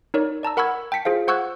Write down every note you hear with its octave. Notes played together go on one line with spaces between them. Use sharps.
D#4 A#4 C#5 D5
D5 A5 A#5 E6
A#4 F#5 B5 C#6 E6 G#6
G5 A5 B6 C#7
F4 G#4 C5 F5
C5 F#5 C#6 E6 F#6 G#6